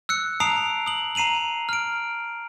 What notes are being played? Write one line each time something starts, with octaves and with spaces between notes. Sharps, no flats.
E6 F#6 C#7
A5 A#5 D#6 C7 D7 F7
D#6 F#7
A#5 C7 D#7 F7 F#7
F6 D7